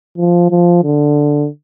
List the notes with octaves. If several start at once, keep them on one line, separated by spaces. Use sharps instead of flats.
F3
F3
D3